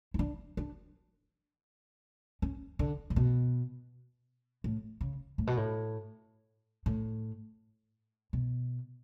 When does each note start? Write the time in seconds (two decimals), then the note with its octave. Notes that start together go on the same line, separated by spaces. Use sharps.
0.14 E4
0.19 D4
0.57 D4
2.42 C#4
2.79 D3
3.10 A2
3.16 B2
4.64 A2
5.01 C#3
5.38 A2
5.47 B2
5.57 A2
6.86 A2
8.33 B2